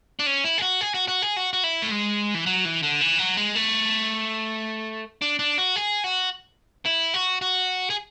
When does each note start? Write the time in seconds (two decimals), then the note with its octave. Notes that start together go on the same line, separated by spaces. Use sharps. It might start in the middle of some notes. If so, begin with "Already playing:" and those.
0.19 D4
0.26 C#4
0.44 E4
0.58 G#4
0.62 F#4
0.81 G#4
0.95 F#4
1.08 F#4
1.22 G#4
1.36 F#4
1.53 F#4
1.64 E4
1.82 A3
1.91 G#3
2.34 E3
2.46 F#3
2.65 E3
2.83 D3
3.01 E3
3.19 F#3
3.37 G#3
3.55 A3
5.22 D4
5.39 D4
5.58 F#4
5.76 G#4
6.04 F#4
6.86 E4
7.14 F#4
7.41 F#4
7.90 G#4